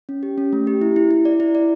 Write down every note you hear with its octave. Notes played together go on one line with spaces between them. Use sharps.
C#4
G4
C#4
A3
G4
E4
E4
E4
D5
E4
D5